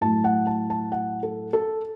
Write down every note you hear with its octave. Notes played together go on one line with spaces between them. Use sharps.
A2 F#3 A3 A5
F#5
A5
A5
F#5
A4
A4